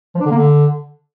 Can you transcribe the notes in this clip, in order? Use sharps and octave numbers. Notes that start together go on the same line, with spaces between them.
F3
D4
D3
A#3
D3